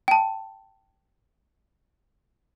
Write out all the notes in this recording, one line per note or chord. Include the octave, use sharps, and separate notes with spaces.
G5 A5